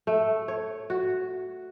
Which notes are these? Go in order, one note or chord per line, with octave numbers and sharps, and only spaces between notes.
A3
C#5
F#4